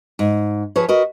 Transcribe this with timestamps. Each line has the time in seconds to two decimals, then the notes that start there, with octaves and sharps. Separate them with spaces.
0.19 G#2
0.76 F3 G#4 B4 C#5
0.89 F#4 A#4 B4 D#5